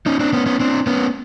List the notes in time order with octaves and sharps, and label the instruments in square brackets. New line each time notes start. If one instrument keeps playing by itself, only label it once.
[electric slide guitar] C#4 D#4
C4 D4
B3 C#4
B3 C#4
C4 D4
B3 C#4